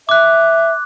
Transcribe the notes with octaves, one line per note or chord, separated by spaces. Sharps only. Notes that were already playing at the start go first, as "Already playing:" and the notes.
E5 D6 F#6